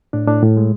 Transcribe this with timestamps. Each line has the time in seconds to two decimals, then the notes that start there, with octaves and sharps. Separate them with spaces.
0.13 A2 D4
0.27 A2 D4
0.42 A2
0.57 G#3